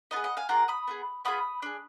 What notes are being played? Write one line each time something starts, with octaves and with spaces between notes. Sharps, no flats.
B3 F4 B4 D#5
G#4
D#5 F#5
F5 G#5
A#3 F4 G#4 F#5 A#5
B5 D#6
B3 F4 G#4
B3 F4 G#4 B5 D#6
D4 G#4